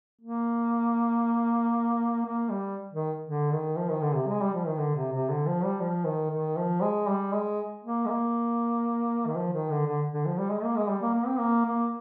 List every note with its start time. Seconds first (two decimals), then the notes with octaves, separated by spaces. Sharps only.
0.21 A#3
2.25 A#3
2.50 G3
2.93 D#3
3.26 D3
3.52 D#3
3.77 F3
3.90 D#3
4.02 D3
4.15 C3
4.29 G#3
4.42 G3
4.54 F3
4.67 D#3
4.78 D3
4.96 C3
5.12 C3
5.30 D3
5.46 F3
5.64 G3
5.80 F3
6.05 D#3
6.31 D#3
6.57 F3
6.82 G#3
7.08 G3
7.33 G#3
7.84 A#3
8.05 G#3
8.09 A#3
9.27 D#3
9.36 F3
9.53 D#3
9.70 D3
9.87 D3
10.13 D3
10.26 F3
10.38 G3
10.51 G#3
10.64 A#3
10.76 G#3
10.89 G3
11.02 A#3
11.14 A#3
11.26 C4
11.39 A#3
11.66 A#3